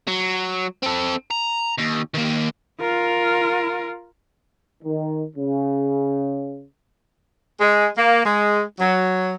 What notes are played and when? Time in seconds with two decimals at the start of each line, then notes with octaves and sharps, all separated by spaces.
0.08 F#3
0.83 C4 A4
1.31 A#5
1.79 D#2
2.15 D#3 A#3
2.81 F4 A#4
4.84 D#3
5.35 C#3
7.61 G#3
7.97 A#3
8.26 G#3
8.80 F#3